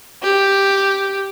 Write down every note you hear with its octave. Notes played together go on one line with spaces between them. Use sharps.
G4